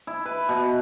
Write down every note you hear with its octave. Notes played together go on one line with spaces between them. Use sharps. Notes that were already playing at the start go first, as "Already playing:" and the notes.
E4
B4
B2